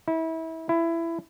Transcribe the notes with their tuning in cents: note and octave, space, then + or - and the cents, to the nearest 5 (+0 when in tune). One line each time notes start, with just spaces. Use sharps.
E4 -30
E4 +15